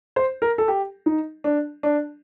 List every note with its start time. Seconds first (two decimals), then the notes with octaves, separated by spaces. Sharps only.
0.16 C5
0.42 A#4
0.58 A4
0.68 G4
1.06 D#4
1.44 D4
1.83 D4